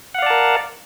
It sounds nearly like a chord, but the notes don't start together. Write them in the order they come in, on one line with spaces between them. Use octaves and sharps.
F#5 F5 D5 A5 A#4